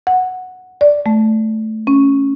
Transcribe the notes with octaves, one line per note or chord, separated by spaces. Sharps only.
F#5
D5
A3
C#4